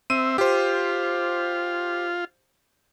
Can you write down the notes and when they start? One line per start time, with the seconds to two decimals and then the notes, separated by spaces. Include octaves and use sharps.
0.10 C4 E5 D#7
0.38 F4 G4 C5